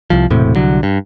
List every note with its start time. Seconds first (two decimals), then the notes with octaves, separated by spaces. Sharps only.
0.10 C2 F3
0.30 E1 A2 C3
0.56 C2 D3 F#3
0.83 G2